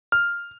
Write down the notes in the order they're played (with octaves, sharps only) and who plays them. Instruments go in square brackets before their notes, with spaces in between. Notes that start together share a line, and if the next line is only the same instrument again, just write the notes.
[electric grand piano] F6